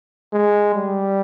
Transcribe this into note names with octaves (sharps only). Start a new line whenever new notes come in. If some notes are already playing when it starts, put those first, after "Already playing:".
G#3
G3